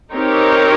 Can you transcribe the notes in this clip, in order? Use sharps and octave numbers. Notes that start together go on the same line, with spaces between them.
C4 D#4 G4 A#4 C#5